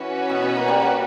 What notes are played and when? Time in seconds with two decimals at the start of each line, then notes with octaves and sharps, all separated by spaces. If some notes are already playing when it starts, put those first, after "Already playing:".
Already playing: E3 C#4 F#4 B4
0.29 B2
0.42 B2
0.56 A#3
0.68 G3
0.82 G3